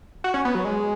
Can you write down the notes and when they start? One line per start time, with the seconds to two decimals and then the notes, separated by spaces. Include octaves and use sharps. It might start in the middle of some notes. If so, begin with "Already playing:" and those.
0.24 F#4
0.34 C#4
0.45 B3
0.55 F#3
0.65 G#3